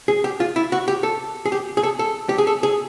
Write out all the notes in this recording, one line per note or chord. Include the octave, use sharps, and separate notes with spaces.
G#4
G4
F4
E4
F#4
G4
A4
G#4
G4
G#4
A4
A4
G4
G#4
A4
G#4